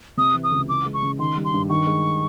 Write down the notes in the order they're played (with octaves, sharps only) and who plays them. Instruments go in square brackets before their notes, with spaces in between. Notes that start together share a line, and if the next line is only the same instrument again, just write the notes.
[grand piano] C3 [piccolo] D#6
[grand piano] E3
[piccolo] D#6
[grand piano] C#2
[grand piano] E3 [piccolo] D6
[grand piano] G#3
[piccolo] C#6
[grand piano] C#3
[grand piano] D#3 [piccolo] C6
[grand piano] G3
[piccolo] C6
[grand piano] G2
[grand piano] D#3 [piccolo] C#6
[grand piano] G#3